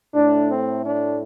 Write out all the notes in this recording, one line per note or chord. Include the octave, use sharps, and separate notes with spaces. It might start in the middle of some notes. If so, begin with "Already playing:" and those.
A2 A3 D4
C4
D4